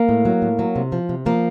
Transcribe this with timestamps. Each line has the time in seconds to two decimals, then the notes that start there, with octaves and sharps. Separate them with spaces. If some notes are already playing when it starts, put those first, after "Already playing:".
Already playing: A#3
0.09 A2
0.25 F#3
0.42 A2
0.59 F#3
0.76 C3
0.92 F3
1.09 C3
1.26 F3 A#3